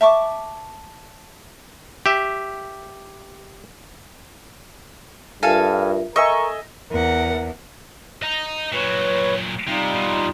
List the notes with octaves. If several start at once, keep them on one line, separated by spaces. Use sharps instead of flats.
E5 A5 C#6 D6
G4 E5
G2 F4 A4 A#4 E5 F5 G#5
A4 A#4 D#5 E5 G#5 C#6
E2 A#4 F#5
D#5 A#5
A#2 F#3 B4 C#5
C3 G3 D#4 F4
D#2 B2